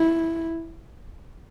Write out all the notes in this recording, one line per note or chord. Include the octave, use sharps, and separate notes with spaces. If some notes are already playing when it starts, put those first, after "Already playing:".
Already playing: E4